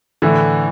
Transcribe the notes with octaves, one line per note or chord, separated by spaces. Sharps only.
A2 D3 E3